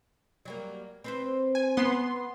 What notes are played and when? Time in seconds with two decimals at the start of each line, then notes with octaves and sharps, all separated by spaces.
0.45 F#3 G3 A#3
1.04 C4 B4 C5
1.55 G#5
1.77 B3 C6